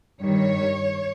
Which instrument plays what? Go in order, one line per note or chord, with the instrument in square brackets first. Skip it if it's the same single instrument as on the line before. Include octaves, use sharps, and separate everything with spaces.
[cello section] G2 D#3 G3 C#5